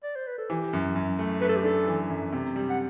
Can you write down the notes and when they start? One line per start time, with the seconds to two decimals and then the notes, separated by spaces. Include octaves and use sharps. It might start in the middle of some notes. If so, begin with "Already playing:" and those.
0.04 D5
0.16 C5
0.27 B4
0.38 A4
0.50 E3 G4
0.73 F#2
0.95 F#2
1.19 A3
1.41 A3 B4
1.49 A4
1.56 G4
1.64 D4 A4
1.87 E3
2.10 F#2
2.32 C3
2.56 G3
2.70 F#5